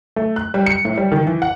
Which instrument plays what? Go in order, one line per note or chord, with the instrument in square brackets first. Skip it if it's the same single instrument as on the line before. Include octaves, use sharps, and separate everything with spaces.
[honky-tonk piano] A3
F#6
G3
C#7
A2
G3
D#3
E3
F#5